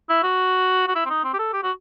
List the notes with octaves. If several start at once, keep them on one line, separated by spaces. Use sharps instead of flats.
E4
F#4
F#4
E4
C4
D#4
C4
G4
A4
G4
F#4